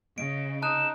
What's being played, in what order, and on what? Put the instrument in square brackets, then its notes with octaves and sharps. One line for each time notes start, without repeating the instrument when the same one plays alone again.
[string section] C#3 [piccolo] D#5 [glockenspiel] D7
[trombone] D#4 [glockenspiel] A5 D#6 F#6 [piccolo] E7